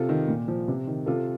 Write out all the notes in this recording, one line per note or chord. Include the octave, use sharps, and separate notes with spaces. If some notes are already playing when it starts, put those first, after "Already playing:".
Already playing: C3 F4 A4
D#3
A#2
F3
C3
D#3
C3 F4 A4